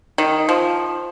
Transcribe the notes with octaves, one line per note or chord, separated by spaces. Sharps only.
D#3
F3